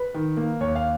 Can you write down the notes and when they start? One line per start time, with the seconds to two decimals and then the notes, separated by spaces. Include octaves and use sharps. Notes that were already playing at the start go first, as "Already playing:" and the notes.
Already playing: B4
0.14 D#3
0.37 A#3
0.61 D#2 C#5
0.75 F5